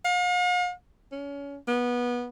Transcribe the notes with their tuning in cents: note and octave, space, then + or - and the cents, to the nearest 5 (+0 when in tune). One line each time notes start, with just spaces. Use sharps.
F5 +45
C#4 +30
B3 -20